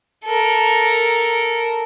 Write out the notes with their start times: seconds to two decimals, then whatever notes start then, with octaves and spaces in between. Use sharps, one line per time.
0.25 A4 A#4